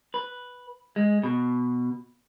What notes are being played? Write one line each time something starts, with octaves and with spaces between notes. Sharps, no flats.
B4
G#3
B2